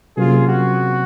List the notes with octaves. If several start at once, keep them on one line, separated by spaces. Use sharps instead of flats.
C3 F#3 A#3 C#4 F4 G#4
F#4